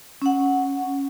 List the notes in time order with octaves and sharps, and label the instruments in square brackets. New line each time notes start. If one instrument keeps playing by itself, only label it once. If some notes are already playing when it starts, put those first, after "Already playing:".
[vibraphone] C#4 F#5